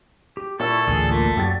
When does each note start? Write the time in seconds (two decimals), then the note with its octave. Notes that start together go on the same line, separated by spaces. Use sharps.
0.37 G4
0.60 A#2 E4 A4 D5 C#6 E6
0.88 A1 D2 G#4
1.11 A3 A#3 F4
1.37 F#2 G4 A4 D5 A6